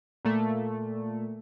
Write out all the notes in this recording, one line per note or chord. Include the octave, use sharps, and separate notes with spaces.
A#2 A3